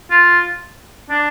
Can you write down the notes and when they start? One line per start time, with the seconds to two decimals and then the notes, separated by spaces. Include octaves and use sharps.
0.10 F4
1.10 D4